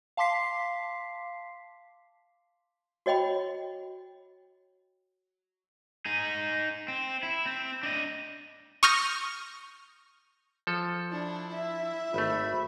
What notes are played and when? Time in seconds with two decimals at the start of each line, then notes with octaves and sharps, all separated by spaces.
0.17 F5 A5 C6 D6 B6 C7
3.06 F#4 C#5 D#5 G5 B5
6.06 D#4 G#4
6.88 C4
7.23 E4
7.46 C4
7.83 D4 D#5
8.83 C#6 D#6 F6 G6 A#6
10.67 F3 A4
11.11 D4 E4
11.54 E5
12.14 G#1 A3 B5